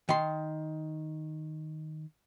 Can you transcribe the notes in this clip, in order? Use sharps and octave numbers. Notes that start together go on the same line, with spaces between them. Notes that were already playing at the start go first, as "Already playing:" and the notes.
D#3 C6